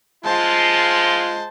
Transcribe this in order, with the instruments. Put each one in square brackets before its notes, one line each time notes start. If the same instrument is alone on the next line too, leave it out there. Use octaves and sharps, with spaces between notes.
[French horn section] G#3 F4 [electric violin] C5 A5